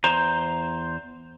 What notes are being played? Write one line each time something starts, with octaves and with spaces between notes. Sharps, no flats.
E2 C5 A#5